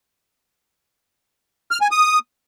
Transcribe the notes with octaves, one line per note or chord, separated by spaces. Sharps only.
F6
G#5
D#6